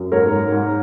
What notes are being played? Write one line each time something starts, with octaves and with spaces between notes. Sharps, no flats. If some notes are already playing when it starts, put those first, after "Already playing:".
Already playing: F#2
G#2 A#4 C#5
G#2
G#2